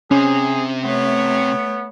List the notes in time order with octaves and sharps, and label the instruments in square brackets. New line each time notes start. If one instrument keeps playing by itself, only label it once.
[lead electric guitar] C3 [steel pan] C#4 [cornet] G#4
[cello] A3 C#5 [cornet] B3